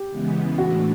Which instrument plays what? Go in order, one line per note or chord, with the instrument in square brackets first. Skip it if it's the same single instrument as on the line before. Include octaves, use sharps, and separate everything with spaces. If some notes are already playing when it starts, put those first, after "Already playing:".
Already playing: [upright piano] G4
[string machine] C#3 E3 G#3 B3
[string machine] A2 E3 A3 D4 [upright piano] F#4